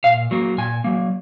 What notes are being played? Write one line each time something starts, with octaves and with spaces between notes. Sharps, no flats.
A#2 F5
F#3 A#3
A#2 G#5
F#3 A#3